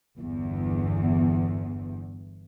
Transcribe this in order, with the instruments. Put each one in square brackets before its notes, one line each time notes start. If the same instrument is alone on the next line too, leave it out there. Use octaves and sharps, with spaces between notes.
[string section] G1 E2